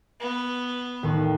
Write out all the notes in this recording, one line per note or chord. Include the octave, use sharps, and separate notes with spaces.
B3
A1 D#2